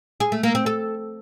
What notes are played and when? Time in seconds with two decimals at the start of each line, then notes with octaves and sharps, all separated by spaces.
0.20 G#4
0.32 A3
0.43 A#3
0.55 C4
0.66 A4